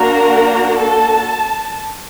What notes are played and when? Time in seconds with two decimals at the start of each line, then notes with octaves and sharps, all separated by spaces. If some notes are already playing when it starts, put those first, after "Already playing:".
Already playing: A#3 D4 F#4 A#4 A#5
0.78 A4 A5